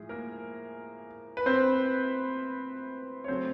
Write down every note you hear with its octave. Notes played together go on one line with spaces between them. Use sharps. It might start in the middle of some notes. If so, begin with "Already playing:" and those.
Already playing: A2 F3 G#3 G#4
A#3 A#4
B4
C4 C5
C#5
C#3 F#3 A3 C4 C5